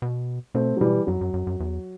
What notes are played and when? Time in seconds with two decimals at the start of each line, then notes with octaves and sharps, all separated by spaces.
0.02 B2
0.55 B2 A3 C4
0.77 F#3
0.81 B2 E3 G3
1.07 F#2 F#3
1.21 F#2
1.34 F#2
1.47 F#2
1.60 E2